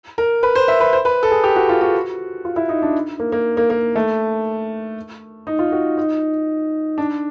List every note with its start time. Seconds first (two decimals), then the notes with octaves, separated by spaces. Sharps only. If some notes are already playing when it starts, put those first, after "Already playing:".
0.18 A#4
0.43 B4
0.55 C5
0.68 E5
0.80 B4
0.93 C5
1.05 B4
1.23 A4
1.31 G#4
1.44 G4
1.56 F#4
1.69 F4
1.81 F#4
2.45 F4
2.56 E4
2.69 D#4
2.82 D4
3.20 A#3
3.32 A#3
3.57 A#3
3.70 A#3
3.96 A3
5.47 D#4
5.59 F4
5.72 F#4
5.98 D#4
6.98 D4